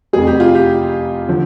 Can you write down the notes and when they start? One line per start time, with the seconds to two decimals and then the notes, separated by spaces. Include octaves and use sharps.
0.13 F1 F2 C3 G#4
0.27 G4
0.40 F4
0.55 G4
1.28 D3 F3